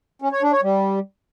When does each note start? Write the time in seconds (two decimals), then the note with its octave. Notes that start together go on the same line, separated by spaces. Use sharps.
0.22 C#4
0.32 C#5
0.42 D4
0.52 C#5
0.63 G3